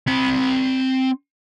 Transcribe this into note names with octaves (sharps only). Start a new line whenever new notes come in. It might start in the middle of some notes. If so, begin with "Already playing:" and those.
C4 B5